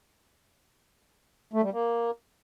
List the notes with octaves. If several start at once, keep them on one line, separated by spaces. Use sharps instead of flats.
A3
G3
A#3